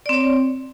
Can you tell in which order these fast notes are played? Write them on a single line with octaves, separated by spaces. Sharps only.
D5 C4 C#5